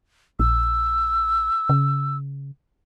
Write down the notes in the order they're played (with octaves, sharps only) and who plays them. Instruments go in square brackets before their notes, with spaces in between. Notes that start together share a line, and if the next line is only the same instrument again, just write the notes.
[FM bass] A#1 [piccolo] E6
[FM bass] C#3